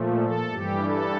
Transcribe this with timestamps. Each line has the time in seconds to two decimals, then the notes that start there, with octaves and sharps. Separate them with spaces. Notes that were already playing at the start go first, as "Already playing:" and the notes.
Already playing: A#2 F3 A3
0.20 A4
0.51 G2 E3 G3 G4
0.84 A4